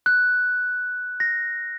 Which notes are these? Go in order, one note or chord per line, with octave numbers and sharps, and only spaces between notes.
F#6
A#6